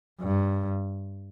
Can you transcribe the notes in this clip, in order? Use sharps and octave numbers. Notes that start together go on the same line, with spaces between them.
G2